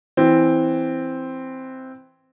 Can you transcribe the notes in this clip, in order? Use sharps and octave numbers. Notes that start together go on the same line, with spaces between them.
E3 C4